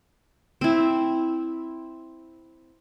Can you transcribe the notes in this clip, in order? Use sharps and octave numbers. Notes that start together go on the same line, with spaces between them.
C4 E4